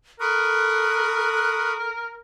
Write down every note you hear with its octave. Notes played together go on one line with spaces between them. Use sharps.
A4 A#4 B5 C#6 D#6 F#6